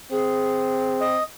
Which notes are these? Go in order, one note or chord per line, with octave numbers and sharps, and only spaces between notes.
C4 G#4
D#5